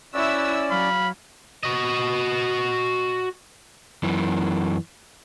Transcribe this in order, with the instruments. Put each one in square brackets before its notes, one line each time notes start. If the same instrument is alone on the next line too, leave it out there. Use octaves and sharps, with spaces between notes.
[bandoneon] C#4 D5 [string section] E4 E6 [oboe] F#4
[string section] F#3 [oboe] F5 [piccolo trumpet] B5
[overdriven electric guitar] F#4 D#5
[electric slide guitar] F#2 E3